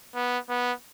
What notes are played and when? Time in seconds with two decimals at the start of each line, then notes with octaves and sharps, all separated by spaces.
0.15 B3
0.49 B3